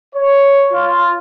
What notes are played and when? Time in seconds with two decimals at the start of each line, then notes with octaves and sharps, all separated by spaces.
0.15 C#5
0.72 F4